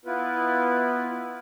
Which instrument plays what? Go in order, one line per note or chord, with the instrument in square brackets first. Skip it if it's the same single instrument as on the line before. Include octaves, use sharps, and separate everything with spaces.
[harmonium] B3 E4 F4 B4